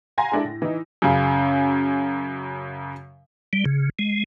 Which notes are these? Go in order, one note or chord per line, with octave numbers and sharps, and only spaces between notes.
F5 F#5 G#5 A#5 C6 A#6
G#3 D4 E4 A4
A2
E3 D#4
F#2 C#3
G3
C#3
G#3